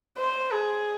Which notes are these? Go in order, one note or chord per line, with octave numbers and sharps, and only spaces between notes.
C5
G#4